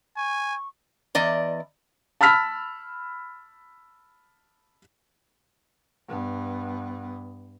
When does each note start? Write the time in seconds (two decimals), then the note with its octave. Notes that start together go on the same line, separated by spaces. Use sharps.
0.17 G#5 C#6
1.15 E2 D5 D#5
2.21 A5 B5 E6 F6 B6
6.08 G2 B3